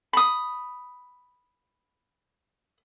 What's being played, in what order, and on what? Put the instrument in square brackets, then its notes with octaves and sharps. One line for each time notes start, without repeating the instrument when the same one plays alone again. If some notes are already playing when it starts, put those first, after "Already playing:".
[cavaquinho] B5 D#6